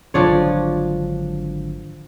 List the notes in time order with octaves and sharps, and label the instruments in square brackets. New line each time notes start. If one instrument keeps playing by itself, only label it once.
[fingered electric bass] G#1 D3 F#3 [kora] F3 D4 C#5